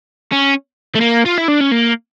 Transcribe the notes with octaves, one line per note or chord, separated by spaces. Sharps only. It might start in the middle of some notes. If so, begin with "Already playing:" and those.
C#4
A3
A#3
F4
E4
D4
C#4
A#3